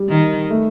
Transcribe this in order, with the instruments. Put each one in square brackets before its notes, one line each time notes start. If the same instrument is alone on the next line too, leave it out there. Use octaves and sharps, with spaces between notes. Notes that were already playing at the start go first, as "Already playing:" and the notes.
Already playing: [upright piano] G3
[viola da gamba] D#3
[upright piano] A3